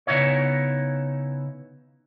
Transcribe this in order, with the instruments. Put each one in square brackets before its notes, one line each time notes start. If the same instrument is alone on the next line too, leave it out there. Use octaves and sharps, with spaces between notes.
[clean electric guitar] C#3 B3 D#4 E4 C#5